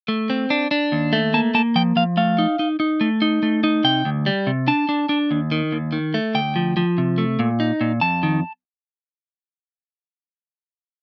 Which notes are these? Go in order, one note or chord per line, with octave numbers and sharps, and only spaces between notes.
A3
C4
D4
D4
D#2
A3
A#3 A5
A#3 A5
F3 G5
F3 F5
A3 F5
D#4
D#4
D#4
A3
D#4
A3
D#4
C3 G5
D2
G3
C3
D4 A5
D4
D4
D#2
D#3
D#2
D#3
A3
D2 G5
F3
F3
C3
A3
A#2
D#4
A#2
F2 A5
D#3